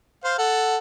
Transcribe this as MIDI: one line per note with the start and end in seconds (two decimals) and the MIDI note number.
0.24 0.36 72
0.24 0.36 77
0.38 0.77 69
0.38 0.77 78